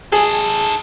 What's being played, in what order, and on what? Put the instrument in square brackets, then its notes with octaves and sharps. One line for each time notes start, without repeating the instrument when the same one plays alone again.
[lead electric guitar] D#4 A4 [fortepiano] G#4